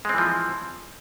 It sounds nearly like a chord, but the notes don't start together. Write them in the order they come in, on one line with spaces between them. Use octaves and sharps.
G#3 C4 E3 F3